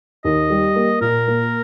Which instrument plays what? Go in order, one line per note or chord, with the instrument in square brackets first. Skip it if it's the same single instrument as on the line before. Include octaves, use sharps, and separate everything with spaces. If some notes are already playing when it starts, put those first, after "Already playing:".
[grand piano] D#2 [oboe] D#5
[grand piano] G3
A#3
[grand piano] A#2 [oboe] A#4
[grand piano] A#3